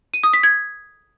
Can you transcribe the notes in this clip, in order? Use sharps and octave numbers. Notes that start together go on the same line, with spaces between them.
D#7
D#6
B6
G#6